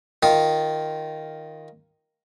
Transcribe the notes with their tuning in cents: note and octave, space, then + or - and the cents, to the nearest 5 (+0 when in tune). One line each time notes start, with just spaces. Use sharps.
D#3 +0 F4 +0 D#6 +0